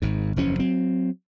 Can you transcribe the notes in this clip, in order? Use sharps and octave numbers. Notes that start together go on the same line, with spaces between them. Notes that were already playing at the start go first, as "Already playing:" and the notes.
G#1 G#2
F#1 E2 F3 C#4
F#3 C4